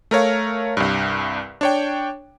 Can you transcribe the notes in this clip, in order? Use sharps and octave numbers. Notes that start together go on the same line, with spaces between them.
A3 A#4 C#5 F5
C2 G2
D4 C#5 G5